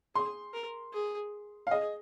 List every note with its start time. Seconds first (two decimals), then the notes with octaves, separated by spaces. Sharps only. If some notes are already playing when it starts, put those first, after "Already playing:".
0.15 G#4 C6
0.54 A#4
0.93 G#4
1.67 F5
1.71 G#4 D#5